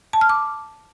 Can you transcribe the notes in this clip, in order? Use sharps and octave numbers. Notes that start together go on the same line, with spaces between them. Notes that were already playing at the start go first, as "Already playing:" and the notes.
A5
F6
D6